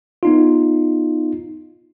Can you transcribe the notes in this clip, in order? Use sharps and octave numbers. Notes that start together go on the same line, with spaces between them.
B3 D#4 F4